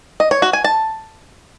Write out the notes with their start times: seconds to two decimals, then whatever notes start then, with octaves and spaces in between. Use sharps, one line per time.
0.20 D#5
0.31 C#5
0.42 F#4
0.53 G#5
0.64 A5